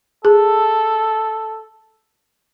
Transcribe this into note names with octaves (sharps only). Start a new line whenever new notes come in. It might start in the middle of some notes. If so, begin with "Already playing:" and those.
G#4 A4